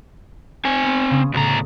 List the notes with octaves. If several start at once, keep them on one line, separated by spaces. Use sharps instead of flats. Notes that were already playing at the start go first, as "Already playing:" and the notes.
C4 G#5
B3 C5
C#3 C#4 D#6
D2 A2 C#3 A#5